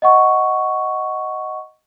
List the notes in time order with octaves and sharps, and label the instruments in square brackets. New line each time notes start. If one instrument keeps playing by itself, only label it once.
[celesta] D#5 F#5 C#6